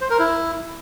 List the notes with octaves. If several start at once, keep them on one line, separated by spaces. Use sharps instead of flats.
C5
A#4
E4